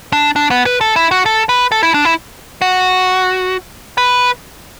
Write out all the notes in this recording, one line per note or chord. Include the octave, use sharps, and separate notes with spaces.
D4
D4
B3
B4
A4
E4
F#4
A4
B4
A4
E4
D4
E4
F#4
B4